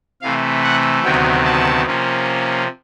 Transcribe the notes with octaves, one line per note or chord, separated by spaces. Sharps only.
C3 E3 A3 F5
F#5
D2 C3 D#3 F#3 B3 G5
A5
C3 F3 A#3 C#4